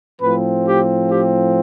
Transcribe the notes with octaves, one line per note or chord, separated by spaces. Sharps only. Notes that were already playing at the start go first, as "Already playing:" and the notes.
A2 F3 C4 B4
G4
G4